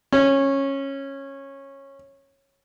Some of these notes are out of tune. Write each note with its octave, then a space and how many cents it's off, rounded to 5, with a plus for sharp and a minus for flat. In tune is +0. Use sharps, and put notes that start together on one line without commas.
C#4 -15